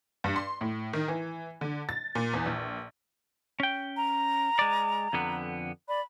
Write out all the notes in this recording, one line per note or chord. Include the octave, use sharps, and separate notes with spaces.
G2
C6
A2
D#3
E3
D3
A6
A#2
E2
A#1
C#4 G5
A#5
G#3 D5
F2 D3 B3
D5 B5